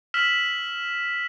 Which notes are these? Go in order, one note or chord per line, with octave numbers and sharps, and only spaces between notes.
E6 F6 B6 E7 F#7